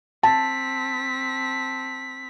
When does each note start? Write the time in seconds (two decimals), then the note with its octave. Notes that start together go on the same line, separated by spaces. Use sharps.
0.23 C4 A5 B6